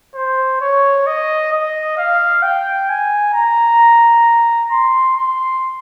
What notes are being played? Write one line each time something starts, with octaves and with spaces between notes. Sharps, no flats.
C5
C#5
D#5
D#5
F5
G5
G#5
A#5
C6
C6